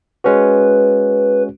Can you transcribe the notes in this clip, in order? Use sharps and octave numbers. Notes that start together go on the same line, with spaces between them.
G#3 C#4 F#4 B4